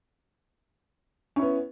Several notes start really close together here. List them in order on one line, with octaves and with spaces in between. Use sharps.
C#4 E4 B3